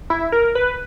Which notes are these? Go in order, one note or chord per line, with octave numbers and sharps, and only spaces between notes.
E4
A#4
B4